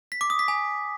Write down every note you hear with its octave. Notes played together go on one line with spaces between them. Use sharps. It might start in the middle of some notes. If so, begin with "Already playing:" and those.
B6
D6
D#6
B6
G#5